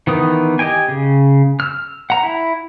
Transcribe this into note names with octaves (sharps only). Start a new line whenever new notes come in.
D#3 E3 B3 D#6
G4 D#5 G5 G#5
C#3
E6 F6
F#5 A#5
E4